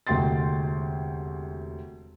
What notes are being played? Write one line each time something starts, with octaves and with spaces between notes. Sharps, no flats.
E1 D2 C3 G5 C6 A6